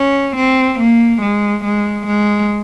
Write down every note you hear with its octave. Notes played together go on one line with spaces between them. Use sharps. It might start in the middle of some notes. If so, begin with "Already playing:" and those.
Already playing: C#4
C4
A#3
G#3
G#3
G#3